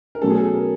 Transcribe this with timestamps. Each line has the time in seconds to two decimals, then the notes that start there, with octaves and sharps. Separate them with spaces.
0.15 A#4
0.22 B2 F#3 A3 C#4 F#4 A4
0.30 G#4
0.38 A4
0.54 A#4